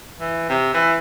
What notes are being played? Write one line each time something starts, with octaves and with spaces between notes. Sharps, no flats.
E3
C3
E3